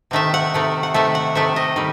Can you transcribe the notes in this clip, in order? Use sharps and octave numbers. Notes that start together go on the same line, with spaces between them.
C3 D#3 A3 E5
F#5
C3 D#3 A3
F#5
C3 D#3 A3 E5
F#5
C3 D#3 A3 E5
D#5
D#3 G3